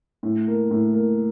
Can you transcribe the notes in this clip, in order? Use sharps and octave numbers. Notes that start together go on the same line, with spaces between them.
A2
A#3
A2
A#3